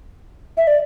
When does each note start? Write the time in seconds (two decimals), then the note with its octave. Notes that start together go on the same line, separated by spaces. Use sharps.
0.57 E5
0.67 D5